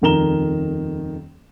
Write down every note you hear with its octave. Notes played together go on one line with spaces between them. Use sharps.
D#1 F2 D#3 A#5 E7 G7